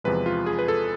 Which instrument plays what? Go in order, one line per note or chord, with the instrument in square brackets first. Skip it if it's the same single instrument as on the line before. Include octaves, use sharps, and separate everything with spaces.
[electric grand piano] E2 C3 F3 G#3 B4
F4
G#4
B4
A4